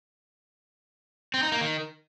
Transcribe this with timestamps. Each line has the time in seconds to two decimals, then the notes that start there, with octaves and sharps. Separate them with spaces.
1.34 C4
1.43 D#4
1.52 A#3
1.61 D#3